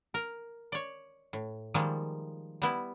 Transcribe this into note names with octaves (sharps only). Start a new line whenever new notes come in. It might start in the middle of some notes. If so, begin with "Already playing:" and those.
A#4
C#5 D5
A2
D#3 F3 G3 G#3 A#3
G3 B3 E4